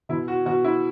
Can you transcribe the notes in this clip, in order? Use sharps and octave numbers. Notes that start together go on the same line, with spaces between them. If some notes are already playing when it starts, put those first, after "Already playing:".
B2 E4
F#4
B2 F#4
E4